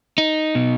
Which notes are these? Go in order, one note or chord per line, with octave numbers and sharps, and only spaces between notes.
D#4
B2